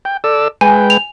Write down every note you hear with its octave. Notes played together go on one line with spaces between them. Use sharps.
G5
A4 D5 E6
G#3 B4 G5 G#5
F7